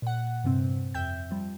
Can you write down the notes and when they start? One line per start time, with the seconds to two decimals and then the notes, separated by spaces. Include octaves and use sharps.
0.02 A#2 F#5
0.44 G2 C3 C4
0.94 F2 E5 G5 G6
1.31 F3 G3